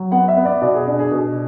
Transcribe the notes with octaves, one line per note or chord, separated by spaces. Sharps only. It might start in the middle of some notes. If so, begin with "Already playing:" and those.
Already playing: F#3
B3 F#5
E5
B3
D5
B2 D5
G#4
D4
G#4
B2